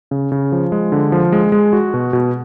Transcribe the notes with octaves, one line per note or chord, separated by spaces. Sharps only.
C#3
C#3
F3
G#3
D3
F3
G#3
G#3
F#4
B2
B2